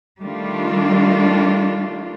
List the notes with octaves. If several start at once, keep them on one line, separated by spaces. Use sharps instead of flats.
D#3 G3 A3 D4 F4